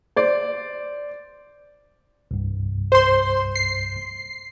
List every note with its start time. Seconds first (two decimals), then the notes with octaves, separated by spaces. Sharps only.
0.16 C5 D5
2.31 C2 G2
2.92 C5 C6
3.55 C7